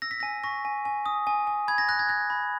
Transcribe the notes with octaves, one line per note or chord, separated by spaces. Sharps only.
E6 A#6
B6
G#5 A#6
C#6 A#6
G#5
G#5
D#6
G#5
G#5
B5 G#6
A#6
F#6 A#6
G#6
F#6 A#6
B5